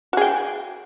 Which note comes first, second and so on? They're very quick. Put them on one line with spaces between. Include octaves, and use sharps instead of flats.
F#4 G#4 G5